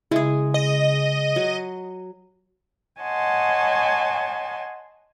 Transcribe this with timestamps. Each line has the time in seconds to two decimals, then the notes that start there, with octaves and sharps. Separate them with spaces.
0.11 C#3 G#3 E4 G#4
0.54 D#5
1.36 F#3
3.00 C#5 D#5 F#5 G#5 A5 C6